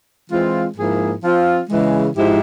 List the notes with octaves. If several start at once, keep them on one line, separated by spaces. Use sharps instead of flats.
E3 G#3 C4 F4
G#2 F3 A#3 E4 G#4
F3 C4 F4
C#3 E3 G#3
G#2 F3 G#3 E4 G4